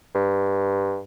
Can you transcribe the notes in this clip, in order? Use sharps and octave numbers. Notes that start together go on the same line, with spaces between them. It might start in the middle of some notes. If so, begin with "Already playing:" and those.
G2